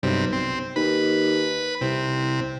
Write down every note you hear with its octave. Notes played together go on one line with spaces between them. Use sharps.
B1 G2 C3
C4
D#2 B4
C2 C3